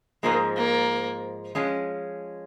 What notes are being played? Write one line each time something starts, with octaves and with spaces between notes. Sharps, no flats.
G#2 F3 G#3 A#3
A#3
F3 G#3 C#4